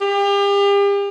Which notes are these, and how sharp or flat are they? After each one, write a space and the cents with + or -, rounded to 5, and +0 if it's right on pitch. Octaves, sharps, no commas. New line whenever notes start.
G4 +40